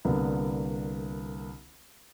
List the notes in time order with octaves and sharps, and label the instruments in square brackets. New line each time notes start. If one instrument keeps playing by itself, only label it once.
[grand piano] C2 D3 A#3 B3